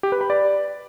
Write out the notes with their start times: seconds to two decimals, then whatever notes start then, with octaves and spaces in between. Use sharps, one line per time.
0.03 G4
0.12 B4
0.21 B5
0.30 D5